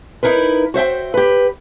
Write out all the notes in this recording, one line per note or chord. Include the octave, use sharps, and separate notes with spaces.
D#4 E4 A#4 B4
F#4 C5 E5 G5
G4 B4